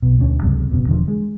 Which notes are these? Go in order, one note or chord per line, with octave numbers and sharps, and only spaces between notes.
B1 B2
D2 C#4
C#2 F#2 C3 G3
F#1 F#2 B2
E1 D3 F3
G#3